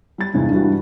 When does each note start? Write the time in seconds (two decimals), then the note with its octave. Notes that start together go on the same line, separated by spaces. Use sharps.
0.18 G3 A6
0.34 E2 G2 C3 G#3 D#4
0.50 G2 E3 G3 D4 F#4